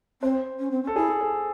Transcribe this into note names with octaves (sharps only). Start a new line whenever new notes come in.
C4 C5
C#4
C4
C#4
A4
E4 G#4
A4